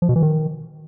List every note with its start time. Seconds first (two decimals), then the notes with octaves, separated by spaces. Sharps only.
0.02 F3
0.09 B2
0.16 E3
0.22 D#3